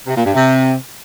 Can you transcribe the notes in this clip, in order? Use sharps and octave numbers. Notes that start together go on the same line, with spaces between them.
C3
A#2
G2
C3